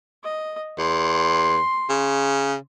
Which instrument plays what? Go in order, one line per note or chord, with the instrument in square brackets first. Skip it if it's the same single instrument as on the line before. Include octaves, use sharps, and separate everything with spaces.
[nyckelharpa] D#5
[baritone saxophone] E2 [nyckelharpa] C6
[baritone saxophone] C#3